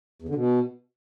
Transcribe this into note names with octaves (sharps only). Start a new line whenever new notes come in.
E2
D3
B2